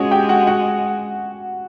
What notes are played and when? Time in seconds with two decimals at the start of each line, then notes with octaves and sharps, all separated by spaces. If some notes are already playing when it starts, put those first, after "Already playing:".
Already playing: G#3 C#4 F#4 C#5 F#5
0.11 G4 G5
0.29 F#4 F#5
0.47 F#4 F#5